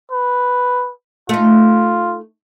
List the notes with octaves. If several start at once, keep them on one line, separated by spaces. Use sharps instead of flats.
B4
A3 D#4 F4